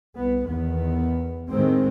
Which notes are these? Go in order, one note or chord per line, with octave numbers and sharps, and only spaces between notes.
C2 B3
E2 D#3 B3
A2 D#3 G#3 C4